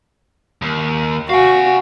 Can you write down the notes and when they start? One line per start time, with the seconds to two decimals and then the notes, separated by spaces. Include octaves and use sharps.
0.62 D#2
1.30 F#4 F5 G#5